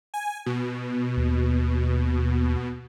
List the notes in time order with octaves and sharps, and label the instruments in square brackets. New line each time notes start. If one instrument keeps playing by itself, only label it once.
[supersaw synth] G#5
B2
[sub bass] D#2